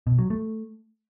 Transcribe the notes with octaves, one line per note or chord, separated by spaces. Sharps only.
B2
F#3
A3